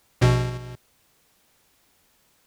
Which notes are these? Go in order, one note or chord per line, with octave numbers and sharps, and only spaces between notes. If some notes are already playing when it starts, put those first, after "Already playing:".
A#1 B2